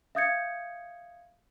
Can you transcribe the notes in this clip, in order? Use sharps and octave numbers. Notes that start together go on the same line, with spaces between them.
E5 F5 D#6 G6 G#6 C#7